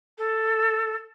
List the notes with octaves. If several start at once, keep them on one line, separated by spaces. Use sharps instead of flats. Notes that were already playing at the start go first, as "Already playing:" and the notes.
A4